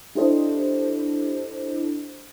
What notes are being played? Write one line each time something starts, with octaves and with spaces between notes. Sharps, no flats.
D4 E4 G4 A4 C5 D#5